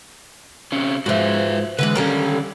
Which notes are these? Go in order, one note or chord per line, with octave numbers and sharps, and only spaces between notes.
C3 C4 C#4
G#2 F3 F#4 B4 E5
D3 E3 G#3 B4
D3 D#3 G3 C#4 A#4